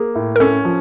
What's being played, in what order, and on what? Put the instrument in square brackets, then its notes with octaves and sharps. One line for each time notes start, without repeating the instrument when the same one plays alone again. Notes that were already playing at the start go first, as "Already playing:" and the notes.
Already playing: [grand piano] A#3 [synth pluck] G#4
[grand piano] A2
[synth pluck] A#4
[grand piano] C#4 [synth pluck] A4
[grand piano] F3